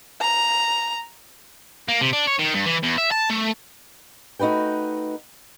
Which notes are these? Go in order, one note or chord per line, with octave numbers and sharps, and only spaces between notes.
A#5
A#3
C3
D4
C#5
D#3
G2
E3
E2
E5
A5
A3
A3 D#4 F#4 B4 G5